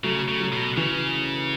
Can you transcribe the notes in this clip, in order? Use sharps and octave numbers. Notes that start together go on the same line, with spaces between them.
C#3 F#3 A3
C#3
F#3
B2
C#3 E3